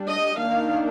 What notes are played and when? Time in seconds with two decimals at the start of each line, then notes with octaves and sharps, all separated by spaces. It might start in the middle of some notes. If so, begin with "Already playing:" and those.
Already playing: G3 D4
0.09 D#5
0.39 D#3 A#3 D4 F5